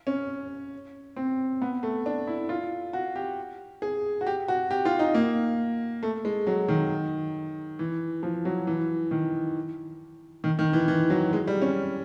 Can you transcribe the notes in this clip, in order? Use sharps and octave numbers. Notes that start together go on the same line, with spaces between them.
C#4
C4
B3
A3
D4
E4
F4
F#4
G4
G#4
F#4
G4
F#4
G4
F4
D#4
A#3
A3
G#3
F#3
D#3
E3
F3
F#3
E3
D#3
D#3
D#3
E3
E3
F#3
G#3
G3
C#4